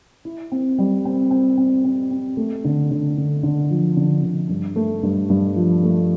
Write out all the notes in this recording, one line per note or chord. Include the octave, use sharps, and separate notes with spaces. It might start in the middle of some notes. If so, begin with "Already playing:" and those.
E4
C4
G3
C4
C4
C4
C4
C4
A3
D3
D3
D3
D3
F3
D3
D3
G2
A3
G2
G2
F3
A3